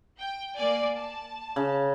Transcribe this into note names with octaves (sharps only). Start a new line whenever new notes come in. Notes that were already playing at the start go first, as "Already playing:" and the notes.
G5
A#3 D5 G#5
A5
C#3